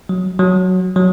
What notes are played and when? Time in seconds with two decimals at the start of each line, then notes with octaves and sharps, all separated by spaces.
0.09 F#3
0.39 F#3
0.96 F#3